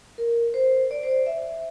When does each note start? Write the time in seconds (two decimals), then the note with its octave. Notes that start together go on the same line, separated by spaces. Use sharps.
0.18 A#4
0.54 C5
0.91 D5
1.03 C5
1.09 D5
1.26 E5